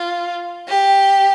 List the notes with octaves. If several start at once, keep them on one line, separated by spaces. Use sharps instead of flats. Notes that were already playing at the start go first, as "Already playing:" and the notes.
Already playing: F4
G4